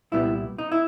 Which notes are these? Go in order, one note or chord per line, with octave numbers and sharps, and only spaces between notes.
C2 A#2 G3 B3 E4
D#4
E4